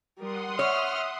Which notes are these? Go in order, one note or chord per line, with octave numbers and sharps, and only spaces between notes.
G3 A#4 F#5 C6 D#6
C#5 E5 F6